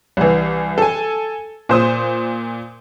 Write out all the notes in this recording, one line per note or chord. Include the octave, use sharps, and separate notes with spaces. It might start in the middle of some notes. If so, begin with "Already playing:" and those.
C2 E3
A4 G#5
A#2 C5 D#6